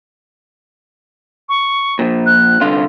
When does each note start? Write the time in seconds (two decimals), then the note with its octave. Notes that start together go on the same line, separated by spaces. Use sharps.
1.49 C#6
1.99 A#2 F3
2.26 F#6
2.61 C2 D3 F4